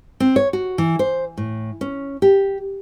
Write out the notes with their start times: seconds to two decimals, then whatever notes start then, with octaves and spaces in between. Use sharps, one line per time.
0.20 C4
0.36 C#5
0.53 F#4
0.78 E3
0.99 C5
1.37 A2
1.81 C#4
2.22 G4